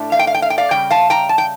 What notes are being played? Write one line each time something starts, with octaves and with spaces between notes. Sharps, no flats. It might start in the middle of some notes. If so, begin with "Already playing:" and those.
Already playing: A2 A3 D4
F5
G5
F5
G5
F5
G5
D5 F5
C#3 G3 G5
F5 A5
G5 A#5
A5
G5